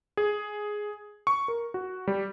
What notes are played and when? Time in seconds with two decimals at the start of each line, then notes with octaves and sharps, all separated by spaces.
0.17 G#4
1.27 C#6
1.48 A#4
1.74 F#4
2.07 G3